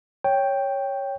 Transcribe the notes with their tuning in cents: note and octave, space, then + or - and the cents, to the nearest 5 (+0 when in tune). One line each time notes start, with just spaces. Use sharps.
C#5 +0 G5 +0